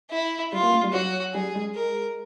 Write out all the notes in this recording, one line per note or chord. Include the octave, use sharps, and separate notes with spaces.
E4
G3 F4
A#3
A3
G3
F#3 F#4
G3 G#4
G#3
A#4